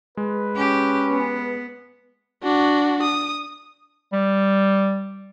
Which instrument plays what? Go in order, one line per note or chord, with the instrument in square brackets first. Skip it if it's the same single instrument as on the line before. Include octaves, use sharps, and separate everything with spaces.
[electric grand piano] G#3 [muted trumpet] B4
[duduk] C#4 [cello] G4
[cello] B3
[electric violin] D4 F#4
D#6
[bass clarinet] G3